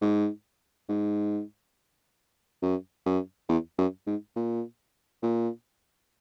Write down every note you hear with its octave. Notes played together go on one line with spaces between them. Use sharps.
G#2
G#2
F#2
F#2
E2
F#2
G#2
A#2
A#2